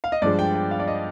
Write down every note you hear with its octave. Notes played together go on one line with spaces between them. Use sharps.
F5
D#5
G2 F3 G#3 D5
G5
G5
F5
D5
D#5